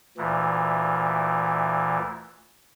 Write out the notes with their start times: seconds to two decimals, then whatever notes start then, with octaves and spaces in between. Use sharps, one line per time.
0.17 D2 A#2 E3